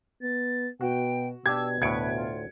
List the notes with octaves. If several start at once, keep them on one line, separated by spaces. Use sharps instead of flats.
B3 A6
B2 F#4 G5
B2 D4 G4 E6 G#6
D2 A2 B4 G#6 C#7 D7
F4